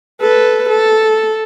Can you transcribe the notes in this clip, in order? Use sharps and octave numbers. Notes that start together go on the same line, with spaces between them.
A4 B4
A4